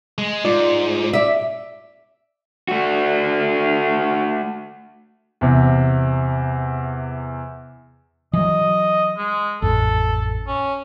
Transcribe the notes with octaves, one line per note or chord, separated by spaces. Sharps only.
G#3
G#2 F4 D5
D5 E5
A3 F#4
E2 C3
E3 F#3 D#5
G#3
A1 F2 A4
C#4